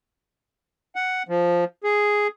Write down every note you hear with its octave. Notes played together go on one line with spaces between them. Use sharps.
F#5
F3
G#4